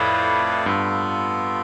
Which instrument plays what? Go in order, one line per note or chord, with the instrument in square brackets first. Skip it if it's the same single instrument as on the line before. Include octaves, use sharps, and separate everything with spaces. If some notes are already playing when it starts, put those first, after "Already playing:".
Already playing: [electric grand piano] F2 A2 [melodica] E4 B4 D5 F5
[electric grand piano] G2 [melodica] B3 F4 A4